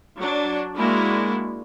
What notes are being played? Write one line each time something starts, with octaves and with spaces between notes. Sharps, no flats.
F#3 D4
G#3 A#3 D4 E4 F#4